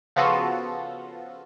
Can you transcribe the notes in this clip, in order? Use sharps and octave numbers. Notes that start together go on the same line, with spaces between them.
C#3 F3 B3 F4 F#4 A4